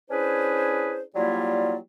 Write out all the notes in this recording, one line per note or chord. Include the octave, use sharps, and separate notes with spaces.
C#4 D4 E4 G#4 B4 C5
F#3 G3 A#3 E4 F4 D5